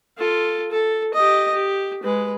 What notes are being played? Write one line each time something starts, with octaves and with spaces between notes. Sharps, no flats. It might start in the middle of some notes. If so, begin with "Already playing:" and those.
F4 A4
A4
G4 D#5
G4
G#3 B4